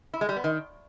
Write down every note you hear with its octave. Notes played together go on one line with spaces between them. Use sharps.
E4
G#3
G3
B3
D#3